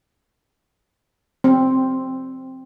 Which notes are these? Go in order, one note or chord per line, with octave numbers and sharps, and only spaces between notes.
C4